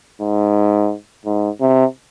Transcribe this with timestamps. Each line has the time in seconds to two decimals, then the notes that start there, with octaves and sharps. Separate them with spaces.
0.21 G#2
1.26 G#2
1.61 C3